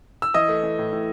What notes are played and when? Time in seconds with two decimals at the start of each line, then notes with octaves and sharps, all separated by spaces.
0.22 E6
0.34 E3 D#5 D#6
0.48 A3
0.63 E3
0.79 A2
0.93 A2